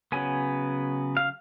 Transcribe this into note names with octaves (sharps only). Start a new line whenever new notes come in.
C#3 F#3 B3 G#5
F5